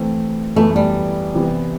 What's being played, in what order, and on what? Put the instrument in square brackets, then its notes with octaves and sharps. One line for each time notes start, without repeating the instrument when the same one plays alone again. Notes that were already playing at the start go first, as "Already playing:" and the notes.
Already playing: [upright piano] E3 A3 C4 E4
[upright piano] F#2 E3 B3 E4 [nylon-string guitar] A3
[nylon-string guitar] G3
[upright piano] C3 E3 B3